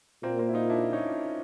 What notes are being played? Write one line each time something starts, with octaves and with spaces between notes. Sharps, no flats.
A#2 A#3 C4
A#3 C4
E4
D#4 F4
D4 E4
C#4 D#4